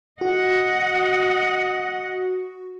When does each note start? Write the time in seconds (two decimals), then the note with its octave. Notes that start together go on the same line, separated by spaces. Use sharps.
0.21 F#4 D#5 F#5